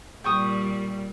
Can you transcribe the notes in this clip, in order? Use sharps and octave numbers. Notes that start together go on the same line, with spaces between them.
A#2 G3 G5 C#6 D#6